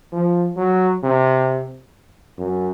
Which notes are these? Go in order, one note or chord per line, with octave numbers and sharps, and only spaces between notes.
F3
F#3
C3
F#2